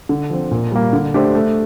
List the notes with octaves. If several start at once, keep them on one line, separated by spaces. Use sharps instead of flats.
D3
F3 C4
A#2
G3 A#3
D3
A3 D4 G4 C5
A3